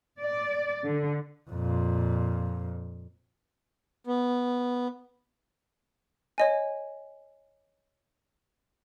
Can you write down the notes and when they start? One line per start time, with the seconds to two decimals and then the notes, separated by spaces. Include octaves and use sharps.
0.20 D5
0.85 D3
1.50 F2 A#2
4.07 B3
6.38 C#5 D#5 G#5